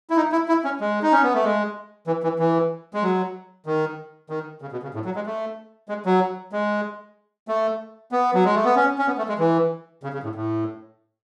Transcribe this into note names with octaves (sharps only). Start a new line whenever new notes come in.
E4
D#4
E4
E4
C#4
G#3
D#4
C#4
B3
A3
G#3
E3
E3
E3
G#3
F#3
D#3
D#3
C#3
B2
C#3
A2
F#3
G#3
A3
G#3
F#3
G#3
A3
B3
F#3
G#3
A3
B3
C#4
C#4
B3
A3
G#3
E3
C#3
C#3
A2
A2